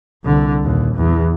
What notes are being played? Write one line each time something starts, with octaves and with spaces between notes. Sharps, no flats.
C2 D3
D#2 A#2
E2